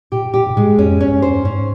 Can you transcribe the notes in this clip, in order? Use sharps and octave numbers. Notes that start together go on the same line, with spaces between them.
A#2 G4
A#2 G4
A#2
G#2 G#3
F2 C#4
C#4
G2
C5
G#2 C#4